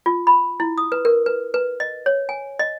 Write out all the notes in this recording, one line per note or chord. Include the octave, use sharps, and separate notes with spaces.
F4
B5
E4
D#6
B4
A#4
B4
B4
D#5
C#5
G#5
D#5